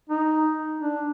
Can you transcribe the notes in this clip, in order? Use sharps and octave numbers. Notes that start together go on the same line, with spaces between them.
D#4
D4